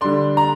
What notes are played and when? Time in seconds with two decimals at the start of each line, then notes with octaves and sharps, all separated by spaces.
0.01 D3 G3 D4 C6
0.37 A#5